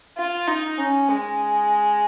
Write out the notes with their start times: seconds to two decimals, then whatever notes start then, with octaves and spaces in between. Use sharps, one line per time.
0.18 F4
0.47 D#4
0.78 C#4
1.09 G#3